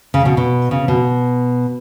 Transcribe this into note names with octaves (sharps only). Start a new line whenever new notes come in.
C#3
B2
B2
C#3
B2